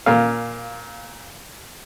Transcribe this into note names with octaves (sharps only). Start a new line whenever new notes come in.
A#2 F5